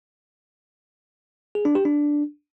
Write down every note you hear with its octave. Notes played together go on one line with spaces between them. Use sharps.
G#4
D4
G4
D4